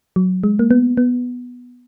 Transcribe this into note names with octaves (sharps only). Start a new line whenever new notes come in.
F#3
G#3
A#3
B3
B3